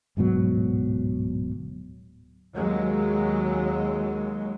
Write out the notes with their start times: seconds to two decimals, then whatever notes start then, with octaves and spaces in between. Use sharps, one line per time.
0.17 D1 G#2 B2 F#3
2.54 D#2 F#3 G#3